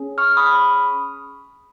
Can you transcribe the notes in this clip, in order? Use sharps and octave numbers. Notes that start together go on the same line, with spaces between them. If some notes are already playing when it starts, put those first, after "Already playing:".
Already playing: C#4 G#4
C#6 F6
B5 D#6